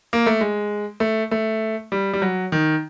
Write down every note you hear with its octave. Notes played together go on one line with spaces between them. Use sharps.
A#3
A3
G#3
A3
A3
G3
G3
F#3
D#3